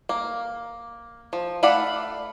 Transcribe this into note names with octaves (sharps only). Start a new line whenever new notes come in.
A#3
F3
A3 D5 F5 F#5 B5